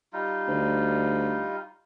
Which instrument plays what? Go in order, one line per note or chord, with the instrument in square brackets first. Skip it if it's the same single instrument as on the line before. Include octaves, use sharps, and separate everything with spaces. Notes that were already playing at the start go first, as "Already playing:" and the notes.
[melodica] G3 D#4 F4
[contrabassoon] D2